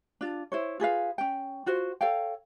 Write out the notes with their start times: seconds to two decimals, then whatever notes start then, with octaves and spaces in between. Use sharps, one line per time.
0.21 D4 F4
0.52 E4 C5 C#5
0.80 F4 G#4 B4 F5
1.18 C#4 G5
1.66 F4 F#4 C5
2.01 A4 C#5 F5 G5